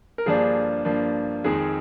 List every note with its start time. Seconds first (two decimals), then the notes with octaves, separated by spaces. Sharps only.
0.18 A#4
0.26 G2 F3 A#3 D4 G#4
0.85 G2 F3 A#3 D4
1.44 F2 D#3 G#3 C4 G#4